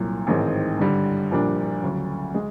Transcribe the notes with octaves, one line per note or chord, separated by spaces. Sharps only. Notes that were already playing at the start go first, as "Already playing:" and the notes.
Already playing: C2 A#2 F#3
A1 G#2 D#3 G#3 C4
G2 D3 G3
A#1 A#2 G3 A#3 D4
D2 C#3 F#3
G#3